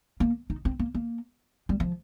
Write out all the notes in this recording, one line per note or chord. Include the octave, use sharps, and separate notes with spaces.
A#3
D#4
C4
A#3
A#3
G3
F3